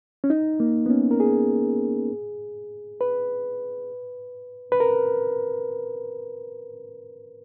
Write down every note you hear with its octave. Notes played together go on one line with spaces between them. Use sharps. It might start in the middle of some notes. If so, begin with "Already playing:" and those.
C#4
D#4
A#3
B3
C#4
A#4
G#4
B4
B4
A#4